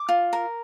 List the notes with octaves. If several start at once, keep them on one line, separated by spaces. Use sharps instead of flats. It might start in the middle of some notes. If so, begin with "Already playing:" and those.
Already playing: D6
F4
A#4